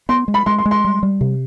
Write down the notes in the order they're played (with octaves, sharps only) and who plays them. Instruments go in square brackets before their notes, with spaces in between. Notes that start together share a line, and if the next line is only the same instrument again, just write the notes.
[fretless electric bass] B3 [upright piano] C6
[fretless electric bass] G#3
[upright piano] B5
[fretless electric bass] G#3 [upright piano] C6
[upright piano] C6
[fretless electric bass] G#3
[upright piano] C6
[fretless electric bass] G3
G3
C3